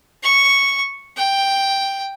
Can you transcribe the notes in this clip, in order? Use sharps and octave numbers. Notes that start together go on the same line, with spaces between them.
C#6
G5